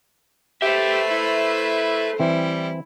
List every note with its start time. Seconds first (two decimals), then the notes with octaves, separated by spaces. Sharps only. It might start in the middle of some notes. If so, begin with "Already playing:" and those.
0.62 G4 A4 B4 C5 E5
1.11 E4
2.20 E3 G3 C4 E4